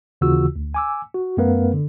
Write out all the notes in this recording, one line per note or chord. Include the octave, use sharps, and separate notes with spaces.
D#2 C#3 E3 F4 F#4 E6
D2
G#5 D6 E6
F#4
F#2 A3 B3 A#4 B4 F5
D3